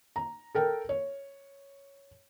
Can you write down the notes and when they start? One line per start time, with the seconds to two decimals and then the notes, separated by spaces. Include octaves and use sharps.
0.16 A#5
0.55 A4 A#4 G5
0.89 C#5